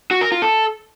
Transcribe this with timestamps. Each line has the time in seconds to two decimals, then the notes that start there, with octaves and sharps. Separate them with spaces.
0.11 F#4
0.21 A#4
0.32 F4
0.42 A4